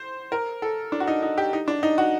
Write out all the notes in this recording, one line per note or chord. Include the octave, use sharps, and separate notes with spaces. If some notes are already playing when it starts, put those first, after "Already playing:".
Already playing: C5
A#4
A4
D4
F#4
D#4
D#4
G4
D#4
D4
D#4
F#4